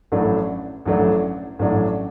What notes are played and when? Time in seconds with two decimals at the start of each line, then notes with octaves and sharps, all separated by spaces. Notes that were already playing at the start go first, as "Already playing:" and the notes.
0.12 A1 A2 F#3 A3 D4
0.86 A1 A2 F#3 A3 D4
1.59 A1 A2 F#3 D4